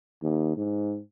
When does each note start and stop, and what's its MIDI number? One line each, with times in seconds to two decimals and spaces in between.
0.23 0.55 39
0.57 1.00 44